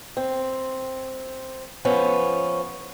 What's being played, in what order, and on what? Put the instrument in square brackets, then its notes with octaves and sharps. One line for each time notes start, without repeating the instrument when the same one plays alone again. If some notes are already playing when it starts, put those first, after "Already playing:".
[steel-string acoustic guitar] C4
F3 B3 C#4